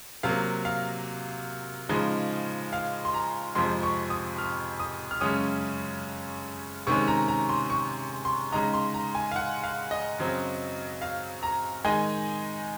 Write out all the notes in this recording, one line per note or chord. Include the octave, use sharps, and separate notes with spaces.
C3 F#3 A#3 F5
F5
C#3 F3 G#3 D#4
F5
C6
A#5
F2 C3 F3 G#3 C6
C#6
D#6
F6
D#6
F6
F#2 C#3 G#3 C#4 D#6
C3 D#3 G#3 C#4 C#6
A#5
A#5
C6
C#6
C6
C#3 G#3 D#4 A#5
C6
A#5
G#5
F5
F#5
F5
D#5
F#2 C#3 F#3 C4
F5
A#5
D#3 G#3 D#4 G#5